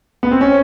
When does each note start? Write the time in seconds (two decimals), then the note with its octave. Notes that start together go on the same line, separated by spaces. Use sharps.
0.23 B3
0.31 C4
0.41 C#4